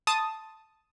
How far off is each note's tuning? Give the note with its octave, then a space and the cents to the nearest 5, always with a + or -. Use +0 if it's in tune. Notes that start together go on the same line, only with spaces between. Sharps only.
A5 +0 C6 +0 D#6 +0